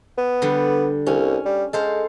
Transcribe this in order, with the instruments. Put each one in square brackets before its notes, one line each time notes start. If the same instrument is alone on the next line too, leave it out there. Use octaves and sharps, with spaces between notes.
[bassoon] B3
[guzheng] D3 G3
[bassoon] C2 [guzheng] C#4
[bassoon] G3
[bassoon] G#3 [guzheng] A4 C5 F5